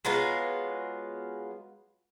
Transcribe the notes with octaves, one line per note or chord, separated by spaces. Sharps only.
F#3 G#3 B3 F4